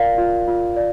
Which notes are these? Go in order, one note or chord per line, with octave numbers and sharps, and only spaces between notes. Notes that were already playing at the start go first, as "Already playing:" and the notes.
Already playing: F4 A#4 D5 F5
F4
F4
D5